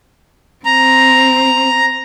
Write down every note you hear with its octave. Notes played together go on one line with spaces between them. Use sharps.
C4 A#5